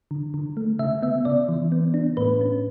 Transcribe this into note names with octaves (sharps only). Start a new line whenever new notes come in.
D3
D3
A3
C#3 E5
B3 E5
C#3 D5
E3
B3
D4
A2 B4
C#4